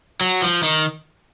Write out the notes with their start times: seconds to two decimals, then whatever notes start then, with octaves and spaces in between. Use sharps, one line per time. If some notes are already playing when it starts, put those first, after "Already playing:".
0.21 F#3
0.42 F3
0.63 D#3